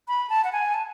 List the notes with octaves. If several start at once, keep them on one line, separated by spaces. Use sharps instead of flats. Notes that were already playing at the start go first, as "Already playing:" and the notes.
B5
A5
F#5
G#5
A5